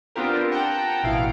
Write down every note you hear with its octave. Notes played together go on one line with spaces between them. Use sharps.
B3 C4 D4 F4 G4 A#4
F#5 G5 A5 A#5 G6
A1 B2 E4 F5 D7